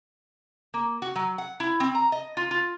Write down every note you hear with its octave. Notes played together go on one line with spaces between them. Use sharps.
A#3
F#4
F#3
F#5
E4
C4
A#5
D#5
F4
F4